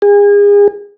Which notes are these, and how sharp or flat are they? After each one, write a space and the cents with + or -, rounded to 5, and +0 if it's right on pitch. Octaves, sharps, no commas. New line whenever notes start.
G#4 -35